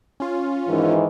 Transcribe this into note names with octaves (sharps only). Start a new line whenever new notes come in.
C#4 F4
G#2 D#3 E3